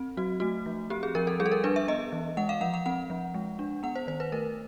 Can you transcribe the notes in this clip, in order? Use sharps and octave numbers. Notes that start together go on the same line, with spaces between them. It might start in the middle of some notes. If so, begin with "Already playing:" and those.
Already playing: C4
F#3 F#4
A3 F#4
F3
C4 G4
G#4
F3 A#4
A4
G3 G#4
A4
A#4
D4 B4
E5
B3 D#5
E3
G#3 F#5
F5
F3 F#5
F#5
C4 F#5
F3
G#3
D4
B3 F#5
C5
D#3 C5
B4
A3 A#4